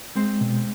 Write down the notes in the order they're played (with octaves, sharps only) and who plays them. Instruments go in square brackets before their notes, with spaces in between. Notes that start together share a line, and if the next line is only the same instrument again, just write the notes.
[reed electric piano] G#3 [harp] C4 C5
[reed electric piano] B2